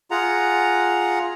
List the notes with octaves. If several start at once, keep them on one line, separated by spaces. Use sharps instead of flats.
F4 G#4 F#5 A#5